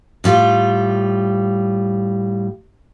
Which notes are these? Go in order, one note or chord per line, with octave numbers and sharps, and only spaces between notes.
A2 G3 F4